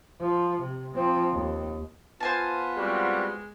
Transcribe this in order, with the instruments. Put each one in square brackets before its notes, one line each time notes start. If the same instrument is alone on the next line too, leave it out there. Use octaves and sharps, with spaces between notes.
[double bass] F3
C3
F3 C4
D#2
[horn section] B3 F4 [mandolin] C5 G#5 A5
[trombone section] G3 C4 F#4 [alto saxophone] G#3